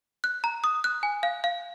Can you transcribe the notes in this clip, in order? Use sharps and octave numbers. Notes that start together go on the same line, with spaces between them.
F#6
A#5
D#6
F#6
G#5
F5
F5